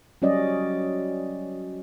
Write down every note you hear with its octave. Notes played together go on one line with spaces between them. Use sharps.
F#3 G3 C#4 F#4 D5 D#5